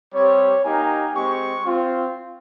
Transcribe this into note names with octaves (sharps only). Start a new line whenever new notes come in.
G3 C4 G4 C#5
A#3 D#4 G4 G#5
G#3 C4 G4 C#6
C4 F4